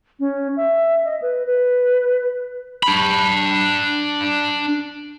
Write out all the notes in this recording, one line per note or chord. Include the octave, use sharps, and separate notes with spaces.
C#4
E5
D#5
B4
B4
D4 B5